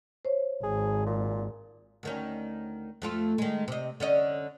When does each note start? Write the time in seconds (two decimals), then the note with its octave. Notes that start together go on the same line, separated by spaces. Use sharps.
0.25 C5 C#5
0.63 G#1 G#4
1.06 A#2
2.03 D2 D#3 C#4
3.02 F2 A3 F4
3.38 D#3 G#3
3.68 C3 D#5
4.00 D3 C#4 D#5